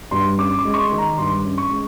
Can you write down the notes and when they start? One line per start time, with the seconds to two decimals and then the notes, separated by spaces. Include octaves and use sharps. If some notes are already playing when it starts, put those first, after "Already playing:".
0.11 G2 C6
0.38 C#4 D6
0.59 D6
0.65 G#3
0.74 C#6
0.77 C6
0.92 D#3
0.98 A#5
1.18 G2 C6
1.44 C#4
1.58 C#6
1.71 G#3